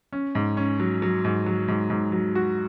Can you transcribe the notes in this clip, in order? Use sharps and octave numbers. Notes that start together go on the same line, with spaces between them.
C#4
G#2
C#4
F#3
F#3
G#2
F#3
G#2
G#2
F#3
F#4